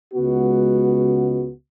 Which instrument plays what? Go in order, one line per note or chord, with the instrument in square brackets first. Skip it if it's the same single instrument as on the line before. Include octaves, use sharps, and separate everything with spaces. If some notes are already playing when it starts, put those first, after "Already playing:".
[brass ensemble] C#2 C#3 G#3 B3 F#4